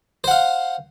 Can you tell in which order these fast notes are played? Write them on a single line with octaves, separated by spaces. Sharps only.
C5 F#5 F5